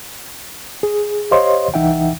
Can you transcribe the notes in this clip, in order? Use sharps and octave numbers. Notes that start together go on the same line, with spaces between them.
G#4
G4 C5 C#5 D#5 F5 C6
C2 E3 D#4 E5 F#5 G5